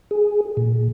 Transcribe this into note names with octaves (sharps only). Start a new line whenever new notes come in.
G#4
A#2